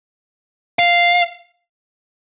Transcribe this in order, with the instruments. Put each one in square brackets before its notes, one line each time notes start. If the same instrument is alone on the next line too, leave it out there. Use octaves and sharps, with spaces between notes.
[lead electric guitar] F5